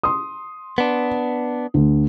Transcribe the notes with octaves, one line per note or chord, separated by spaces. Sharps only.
C6 D#6
B3 D4
D2